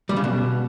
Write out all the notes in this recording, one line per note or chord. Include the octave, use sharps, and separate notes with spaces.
G3
C#3
B2